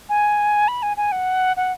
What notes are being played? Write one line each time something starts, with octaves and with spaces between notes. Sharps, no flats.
G#5
B5
G#5
G#5
F#5
F#5